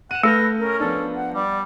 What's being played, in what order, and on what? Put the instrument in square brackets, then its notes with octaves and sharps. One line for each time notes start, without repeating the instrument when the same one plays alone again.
[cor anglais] F#5 [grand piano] D#7 E7
[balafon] A3 [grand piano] A4 F6 G6 [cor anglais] B4 [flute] A#6
[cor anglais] C#4 [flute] A#4
[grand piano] F3 B3 D4 [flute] A4
[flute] F#5
[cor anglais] G3 [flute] D5